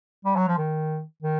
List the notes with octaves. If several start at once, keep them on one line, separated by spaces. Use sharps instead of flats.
G3
F#3
F3
D#3
D#3